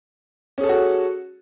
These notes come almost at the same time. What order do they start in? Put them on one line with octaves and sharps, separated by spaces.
C#4 G#4 A4 C#5 F#4